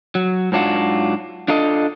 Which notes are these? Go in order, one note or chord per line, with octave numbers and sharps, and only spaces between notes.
F#3
G#2 F#3 D4 F4 F#4
D4 F4 A4 D#5